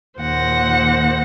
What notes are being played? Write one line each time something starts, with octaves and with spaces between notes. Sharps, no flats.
D#2 A#2 C5 F#5 A#6